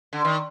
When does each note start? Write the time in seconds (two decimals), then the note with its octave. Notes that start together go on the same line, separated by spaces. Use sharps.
0.13 D3
0.25 D#3